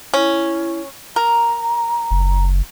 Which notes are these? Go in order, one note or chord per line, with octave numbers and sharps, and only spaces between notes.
C#4 E4
A#4 A#5
F#1